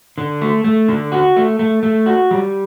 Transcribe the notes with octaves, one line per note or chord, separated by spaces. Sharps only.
D3
A3
A3
D3
F#4
A3
A3
A3
F#4
G3